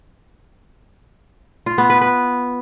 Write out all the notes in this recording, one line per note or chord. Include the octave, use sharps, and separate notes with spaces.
F4
B3
B4
B4